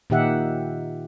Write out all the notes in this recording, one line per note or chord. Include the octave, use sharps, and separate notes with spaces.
A#2 D#3 D#4 G4 E5 F#5